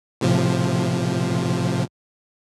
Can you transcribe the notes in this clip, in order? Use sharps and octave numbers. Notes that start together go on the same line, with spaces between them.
A2 C3 F3